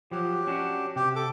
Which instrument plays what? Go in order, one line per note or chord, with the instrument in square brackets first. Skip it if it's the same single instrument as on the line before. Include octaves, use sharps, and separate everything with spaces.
[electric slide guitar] F3 F#3 [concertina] G4
[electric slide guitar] C#4 D4 F#4
[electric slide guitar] C3 [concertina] G4
[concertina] A4 D6